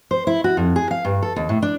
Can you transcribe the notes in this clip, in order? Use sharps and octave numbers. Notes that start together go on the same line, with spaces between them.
C5
E4
F#4
F2
G#4
F5
G2
A4
D#2
A2
D4